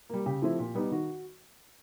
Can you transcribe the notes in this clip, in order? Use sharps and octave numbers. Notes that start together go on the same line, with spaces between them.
G3 A#3
C#3 G4
F3 A3 C4 E4
A#2
G3 B3 D#4
D#3 F#4